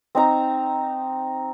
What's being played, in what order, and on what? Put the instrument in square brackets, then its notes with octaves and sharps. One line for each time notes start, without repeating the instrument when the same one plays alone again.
[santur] C4 D#4 A#5